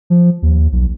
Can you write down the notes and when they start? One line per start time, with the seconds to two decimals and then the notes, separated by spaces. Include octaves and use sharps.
0.10 F3
0.42 D#2
0.72 B1